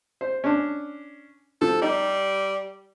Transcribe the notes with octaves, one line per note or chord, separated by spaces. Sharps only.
C5
C#4 D4
F3 A4
G3 D#4